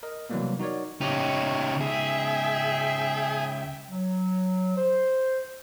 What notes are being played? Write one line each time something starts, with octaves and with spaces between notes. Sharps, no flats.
A#4 D#5
C3 E3 F#3 G3 A#3 B3
D#4 F#4 A#4 C#5 D5
C#2 C#3 D#4 G4 C#5
G#4 E5 G5
F#3
C5